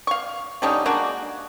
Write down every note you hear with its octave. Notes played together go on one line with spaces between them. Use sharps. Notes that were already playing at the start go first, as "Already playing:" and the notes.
F5 C#6
D3 G3 C#4 D#4
G#3 A#3 D4 F#4